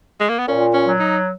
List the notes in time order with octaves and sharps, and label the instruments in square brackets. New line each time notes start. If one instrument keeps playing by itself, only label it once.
[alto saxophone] G#3
A#3
B3
[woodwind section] A#2 [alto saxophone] C#4
[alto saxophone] C#4
[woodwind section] F#3
[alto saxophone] D#4